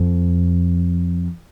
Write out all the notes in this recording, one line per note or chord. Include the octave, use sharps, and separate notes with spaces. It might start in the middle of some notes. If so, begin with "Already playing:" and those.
Already playing: F2